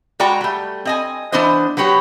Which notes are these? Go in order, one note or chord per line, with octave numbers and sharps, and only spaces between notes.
G#3 F#4 D5 G5 A#5
G3 A3
C4 D#5 G#5
E3 B3 D4 C5 D#5
F#3 B3 F#4 G4 C#5